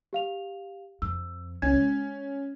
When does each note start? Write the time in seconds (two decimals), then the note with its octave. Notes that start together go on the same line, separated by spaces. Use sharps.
0.13 G4 F5 F7
1.02 F2 E6
1.62 C2 C#4 G#6
1.74 G#3